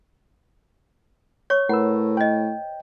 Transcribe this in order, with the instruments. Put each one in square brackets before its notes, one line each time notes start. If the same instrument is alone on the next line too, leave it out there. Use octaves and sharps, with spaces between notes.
[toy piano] C#5 C#6
[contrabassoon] A2 [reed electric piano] A#4 B4 E6 [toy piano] F#5
[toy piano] C5 D#5 [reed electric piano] G5